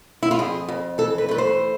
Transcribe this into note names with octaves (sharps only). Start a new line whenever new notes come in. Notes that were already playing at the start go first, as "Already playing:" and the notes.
E4
F4
F2 G#4
F2
E3 A4
B4
A3 B4
C5